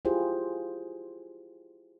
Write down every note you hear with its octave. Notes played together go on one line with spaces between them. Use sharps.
E4 F4 G4 G#4 C5